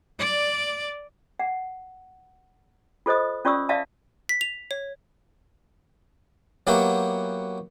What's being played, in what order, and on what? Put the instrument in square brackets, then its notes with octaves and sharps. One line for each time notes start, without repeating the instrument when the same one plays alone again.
[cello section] D5
[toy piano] F#5
F4 A4 C5 D#5 D#6
C#4 F4 D5 C#6 D#6 E6
D5 E5 F5 A5
[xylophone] B6
F7
C#5
[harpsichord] F#3 A#3 B3 E4 F#4 G4